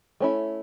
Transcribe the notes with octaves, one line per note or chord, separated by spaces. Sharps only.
A3 C#4 E4